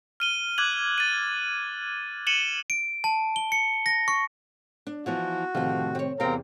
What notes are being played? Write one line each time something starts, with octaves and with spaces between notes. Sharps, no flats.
F6 D#7 G7
D6 F#6 G#6 F#7
A6 D#7
C#7 D#7 E7 F#7 G7
D7
A5
G7
C#7
A#6
C#6
D4
E3 F3 B3 F#4
D2 A2 C3 D#3 F3
C4 C#5
E2 C3 C4 A#4 F5 G5 A#5